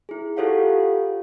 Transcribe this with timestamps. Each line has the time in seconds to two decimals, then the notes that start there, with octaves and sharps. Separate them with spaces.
0.09 E4 G#4
0.37 F4 G4 A4 C#5 F5 F#5